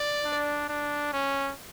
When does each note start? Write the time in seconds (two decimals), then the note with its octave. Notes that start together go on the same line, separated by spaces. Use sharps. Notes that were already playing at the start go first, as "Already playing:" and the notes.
Already playing: D5
0.25 D4
0.69 D4
1.13 C#4